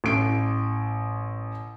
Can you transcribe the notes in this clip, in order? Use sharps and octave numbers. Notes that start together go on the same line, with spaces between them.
A1 D7